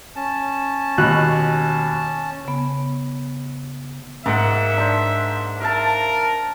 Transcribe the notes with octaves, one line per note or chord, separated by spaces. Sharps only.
C#4 A5
D#2 B2 F#6
C#3 B3
G#2 A#3 E5 F#5
D4 C5
A#4 E5 F5 A5